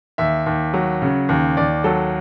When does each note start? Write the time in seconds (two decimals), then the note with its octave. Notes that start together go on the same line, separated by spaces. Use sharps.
0.18 D#2 E5
0.46 D#2
0.74 F#3
1.02 C#3
1.29 D#2
1.57 D#2 D5
1.84 F#3 A4